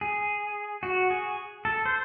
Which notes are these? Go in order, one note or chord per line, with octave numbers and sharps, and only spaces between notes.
G#4
F#4
G#4
A4
C5